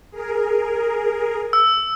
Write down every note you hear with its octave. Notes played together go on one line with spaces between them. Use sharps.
G#4 A#4
E6